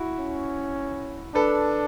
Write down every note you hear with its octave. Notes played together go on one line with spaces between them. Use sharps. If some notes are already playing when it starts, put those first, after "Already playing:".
Already playing: E4 F#4
C#4
D4 A4 B4